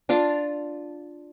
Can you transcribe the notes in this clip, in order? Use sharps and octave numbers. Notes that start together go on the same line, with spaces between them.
D4 F4 F5 A5